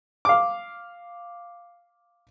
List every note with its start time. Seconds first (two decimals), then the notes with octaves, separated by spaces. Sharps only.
0.25 F5 D6